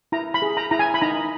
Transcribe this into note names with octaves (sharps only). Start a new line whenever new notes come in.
E4 A#5
B5
G#4
A#5
E4 A#5
G#5
B5
D#4 A#5